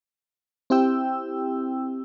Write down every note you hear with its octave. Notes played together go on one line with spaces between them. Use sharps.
C4 E4 G4 G5 E6